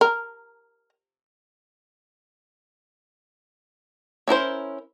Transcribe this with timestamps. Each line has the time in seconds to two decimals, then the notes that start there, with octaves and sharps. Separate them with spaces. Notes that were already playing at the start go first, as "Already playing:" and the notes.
0.01 A#4
4.28 C#4 E4 A#4 C5